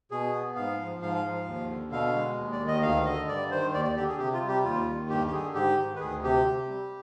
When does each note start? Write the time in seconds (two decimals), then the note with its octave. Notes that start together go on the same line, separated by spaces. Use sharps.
0.11 B2 G#4
0.34 B3
0.56 G#2 F5
0.79 F3
1.02 G#2 F5
1.25 F3
1.47 D#2
1.70 D3
1.92 B2 F5
2.15 G#3
2.37 D#2
2.52 D5
2.60 D#3
2.68 D#5
2.83 D2 F5
3.06 D3 D#5
3.28 G2 D5
3.51 D#3 C5
3.74 D#2 D5
3.85 D5
3.96 D3 G4
4.08 G#4
4.18 C3 G4
4.33 F4
4.42 G3
4.48 G4
4.65 D#2 F4
4.87 D#3
5.09 G2 G4
5.27 G4
5.32 D3 G#4
5.54 G#2 G4
5.78 D#3
5.96 B4
6.00 D2 G#4
6.23 C3 G4
6.46 C3
6.68 G3